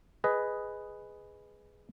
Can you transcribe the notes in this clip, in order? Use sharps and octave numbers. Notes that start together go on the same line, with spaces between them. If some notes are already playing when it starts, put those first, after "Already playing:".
G#4 B4 D#5